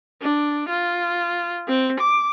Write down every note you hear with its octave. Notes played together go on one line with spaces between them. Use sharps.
D4
F4
C4
D6